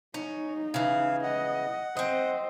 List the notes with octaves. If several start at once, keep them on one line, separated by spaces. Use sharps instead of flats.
C#4 D#4
C#3 E3 F5
D#5 F#5
C4 C5 D#5